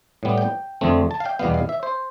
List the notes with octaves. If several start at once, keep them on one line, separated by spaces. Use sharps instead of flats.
A2 G3 B3
G5
F2 D3 A3 C4
A5
F5
G5
E2 B2 G3 B3 F5
F5
E5
C5